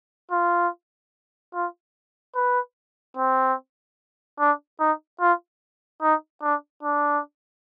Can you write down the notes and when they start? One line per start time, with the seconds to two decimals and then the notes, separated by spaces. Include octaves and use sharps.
0.31 F4
1.54 F4
2.35 B4
3.17 C4
4.39 D4
4.80 D#4
5.21 F4
6.02 D#4
6.43 D4
6.83 D4